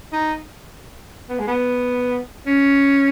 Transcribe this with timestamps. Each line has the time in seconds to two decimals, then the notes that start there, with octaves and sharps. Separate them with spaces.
0.13 D#4
1.29 B3
1.39 G#3
1.48 B3
2.46 C#4